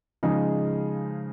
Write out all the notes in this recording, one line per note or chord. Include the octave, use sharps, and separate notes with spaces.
C#3 F3 G#3 D#4 G#4